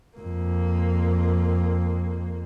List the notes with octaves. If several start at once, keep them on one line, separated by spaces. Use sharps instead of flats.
F2 A#3